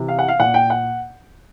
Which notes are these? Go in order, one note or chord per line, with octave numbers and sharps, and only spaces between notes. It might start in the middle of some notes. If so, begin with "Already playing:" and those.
Already playing: C3 E3
F5
F#5
F5
A#2 F#5
G5
F#5